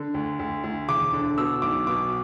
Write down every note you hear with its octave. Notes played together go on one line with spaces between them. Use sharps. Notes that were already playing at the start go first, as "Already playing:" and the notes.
Already playing: D3
D2
D2
D2
E1 D6
D3
B2 E6
B1 D6
B2 D6